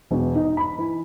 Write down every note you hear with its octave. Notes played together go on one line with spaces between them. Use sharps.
E1
D#4
B5
E3